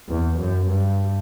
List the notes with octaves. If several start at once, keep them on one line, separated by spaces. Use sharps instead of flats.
E2
F#2
G2